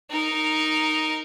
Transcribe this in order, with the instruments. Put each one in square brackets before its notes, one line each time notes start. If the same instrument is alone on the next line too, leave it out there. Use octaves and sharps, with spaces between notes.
[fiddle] D#4 A#4